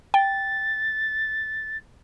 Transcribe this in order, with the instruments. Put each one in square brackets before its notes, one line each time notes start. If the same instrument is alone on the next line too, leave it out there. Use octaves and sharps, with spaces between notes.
[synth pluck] G5 [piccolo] A6